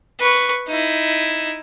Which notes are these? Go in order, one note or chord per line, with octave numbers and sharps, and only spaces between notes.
B4 C#6
D#4 E4